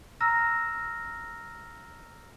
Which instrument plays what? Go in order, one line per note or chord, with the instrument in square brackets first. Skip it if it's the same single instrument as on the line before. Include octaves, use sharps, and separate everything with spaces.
[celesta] A#5 E6 F6 A#6